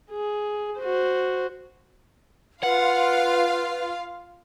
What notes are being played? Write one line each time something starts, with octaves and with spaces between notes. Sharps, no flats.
G#4
F#4 C5
F4 B4 F5 F#5